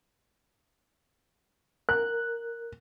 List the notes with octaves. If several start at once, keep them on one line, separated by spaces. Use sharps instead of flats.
A#4 F#6